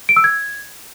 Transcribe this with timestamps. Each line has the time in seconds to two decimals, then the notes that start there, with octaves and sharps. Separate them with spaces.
0.09 D7
0.16 E6
0.24 G#6